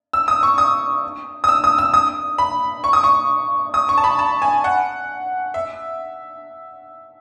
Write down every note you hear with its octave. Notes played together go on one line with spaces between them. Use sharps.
E6
D#6
C#6
D#6
D#6
E6
D#6
E6
D#6
B5
C#6
D#6
C#6
D#6
C#6
A5
B5
A5
G#5
F#5
E5